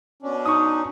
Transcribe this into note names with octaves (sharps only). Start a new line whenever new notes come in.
B2 C#4 D4
D#4 C#6 D#6